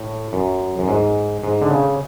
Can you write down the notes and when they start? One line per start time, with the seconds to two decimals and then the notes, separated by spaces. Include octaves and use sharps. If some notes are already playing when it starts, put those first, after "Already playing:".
Already playing: A2
0.33 F#2
0.79 F#2
0.88 G#2
1.44 G#2
1.62 D3
1.71 C#3